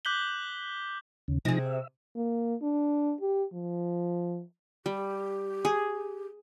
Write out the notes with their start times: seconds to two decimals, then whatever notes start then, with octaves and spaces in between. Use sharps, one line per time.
0.05 D6 F#6 G6 B6 F#7 G7
1.28 D#2 C#3
1.45 C3 F3 D#4 G#4 A#6
1.66 E5
2.16 A#3
2.62 D4
3.21 G4
3.53 F3
4.86 G3 G4
5.65 G#4